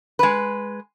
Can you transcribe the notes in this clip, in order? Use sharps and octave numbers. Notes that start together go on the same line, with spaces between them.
G#3 B4